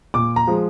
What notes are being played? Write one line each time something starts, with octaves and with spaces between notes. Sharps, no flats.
A#2 D6
A#5
F3 G#3